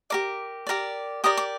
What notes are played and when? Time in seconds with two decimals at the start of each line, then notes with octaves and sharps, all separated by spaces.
0.10 G4 A#4 D5 D6
0.67 G4 A#4 D5
1.24 G4 A#4 D5 D#6
1.37 D6